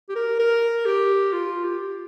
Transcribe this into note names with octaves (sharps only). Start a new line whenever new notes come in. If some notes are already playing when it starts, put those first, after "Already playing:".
G4
A#4
A#4
G4
F4
G4